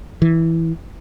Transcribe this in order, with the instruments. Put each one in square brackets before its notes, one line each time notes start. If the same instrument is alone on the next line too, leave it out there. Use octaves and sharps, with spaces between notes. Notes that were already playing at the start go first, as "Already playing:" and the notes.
[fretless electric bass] E3